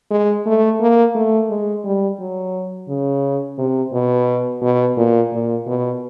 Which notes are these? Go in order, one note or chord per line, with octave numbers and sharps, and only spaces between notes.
G#3
A3
A#3
A3
G#3
G3
F#3
C#3
C3
B2
B2
A#2
A#2
B2